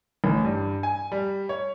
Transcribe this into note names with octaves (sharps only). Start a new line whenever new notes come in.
A1
G2
G#5
G3
C#5